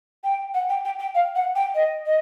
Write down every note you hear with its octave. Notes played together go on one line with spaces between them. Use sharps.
G5
F#5
G5
G5
G5
F5
F#5
G5
D#5
D#5